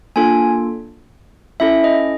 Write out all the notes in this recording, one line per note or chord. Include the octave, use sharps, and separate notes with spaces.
A#3 D4 F4 A4 G#5
C#4 E4 A4 E5
D#5